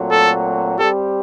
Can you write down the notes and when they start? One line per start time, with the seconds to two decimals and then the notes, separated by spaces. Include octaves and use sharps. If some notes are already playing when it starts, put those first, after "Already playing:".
Already playing: A#2 F#3 A3 C4 F#4
0.11 A4
0.79 G3 C4 G4 A4